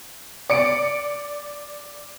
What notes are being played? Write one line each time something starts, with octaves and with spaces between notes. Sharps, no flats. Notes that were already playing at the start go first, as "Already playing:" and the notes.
D5 C#7 D7